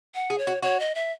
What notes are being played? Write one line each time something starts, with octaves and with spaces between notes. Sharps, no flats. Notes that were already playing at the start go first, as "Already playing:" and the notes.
F#5
G#4
C#5
F#4
F#4 C#5
D#5
E5